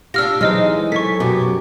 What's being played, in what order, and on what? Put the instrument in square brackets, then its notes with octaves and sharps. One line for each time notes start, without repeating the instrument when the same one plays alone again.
[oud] D4 F4 [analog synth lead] G4 [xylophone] E6 F6 A#6
[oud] E3 [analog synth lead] F#3 [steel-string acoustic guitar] G#3 D#4 [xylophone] C5 D#5 F6
[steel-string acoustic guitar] A4 G#5 [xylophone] C#6 B6
[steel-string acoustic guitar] F#2 G4 [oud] B2